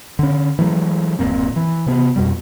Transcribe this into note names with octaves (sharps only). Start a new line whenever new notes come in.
D3 C#4
E3 F#3 G#3 A3
D1 F#2 A#2 C4
E3
C3 B3
F2 B2 G3